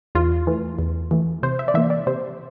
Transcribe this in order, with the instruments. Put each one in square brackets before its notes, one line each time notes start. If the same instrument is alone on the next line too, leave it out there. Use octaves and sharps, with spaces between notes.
[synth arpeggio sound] E2 F4
E3 A3
E2
E3 A3
C3 C5
E5
D5
E3 A#3 E5
D5
C3 C5